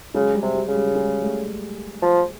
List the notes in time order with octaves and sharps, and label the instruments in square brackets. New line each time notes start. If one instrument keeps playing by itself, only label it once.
[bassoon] C#3 [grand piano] F#3 G#3
[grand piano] G3
[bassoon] C3
[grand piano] G3
[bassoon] C#3
[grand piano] G3
G3
F#3 G#3
G3 A3
[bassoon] F3